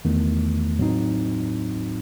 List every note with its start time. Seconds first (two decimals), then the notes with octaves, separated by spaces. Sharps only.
0.05 E2 D#3 A3
0.79 A2 F#3 C4 D#4